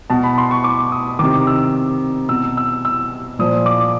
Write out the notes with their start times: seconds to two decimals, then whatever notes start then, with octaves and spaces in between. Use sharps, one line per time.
0.10 B2 A5
0.23 B5
0.38 C6
0.51 C#6
0.64 D6
0.92 D#6
1.19 D#3 D6
1.23 C3
1.47 E6
2.29 B2 E6
2.57 E6
2.85 E6
3.39 A#2 F3 D#6
3.66 D6